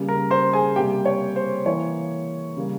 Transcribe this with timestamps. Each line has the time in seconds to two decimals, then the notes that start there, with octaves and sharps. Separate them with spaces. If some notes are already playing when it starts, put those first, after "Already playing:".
Already playing: C#3 G3 A#3
0.09 A#4 A#5
0.31 C5 C6
0.53 G#4 G#5
0.76 C3 G3 A#3 G4 G5
1.06 C#5
1.36 C5
1.66 E3 A#3 C#5
2.57 C#3 G3 A#3